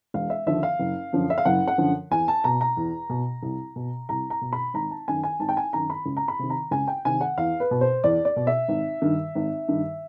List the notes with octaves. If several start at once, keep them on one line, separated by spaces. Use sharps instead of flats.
E1 F5
E5
D#2 D3 F3 E5
F5
F#1
F#2 D3 F3
E5
F5
F#1 F#5
F#5
F#2 D3 F3
E2 G#5
A5
B2 A#5
A#5
E2
B2
C2
B2
C2 A#5
A#5
B2
B5
G#1 A#5
A5
F#2 D#3 G#5
G#5
G#1 A5
G5
G#5
F#2 D#3 A#5
B5
C#2
A#5
B5
C3 D#3
A#5
C#2 G#5
G5
C3 D#3 G#5
F#5
E2 F5
B4
B2
C5
E2 D5
D5
B2
E5
G#1
G2 D#3
G#1
G2 D#3